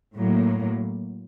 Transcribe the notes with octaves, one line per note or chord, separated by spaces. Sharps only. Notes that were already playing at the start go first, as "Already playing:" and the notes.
A2 F#3 A#3